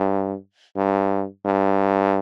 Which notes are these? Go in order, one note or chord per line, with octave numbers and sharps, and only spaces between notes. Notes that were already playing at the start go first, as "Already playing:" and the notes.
Already playing: G2
G2
G2